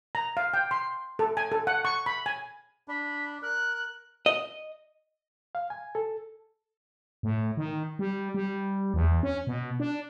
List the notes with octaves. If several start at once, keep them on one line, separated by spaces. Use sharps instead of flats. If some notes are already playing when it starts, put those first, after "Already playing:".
A#5
F5
G5
C6
A4
G#5
A4
F#5
C#6
B5
G#5
D4 B5
A#4 F#6
D#5
F5
G#5
A4
A2
D#3
G3
G3
E2
C#4
B2
D4